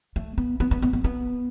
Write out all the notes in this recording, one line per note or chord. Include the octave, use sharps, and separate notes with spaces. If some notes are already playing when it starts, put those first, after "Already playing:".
A3
B3
B3
B3
B3
B3
B3